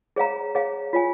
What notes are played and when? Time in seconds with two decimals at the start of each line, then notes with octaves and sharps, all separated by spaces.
0.16 G#4 C#5 F5 A#5
0.55 G#4 C#5 F5
0.93 F4 C#5 G#5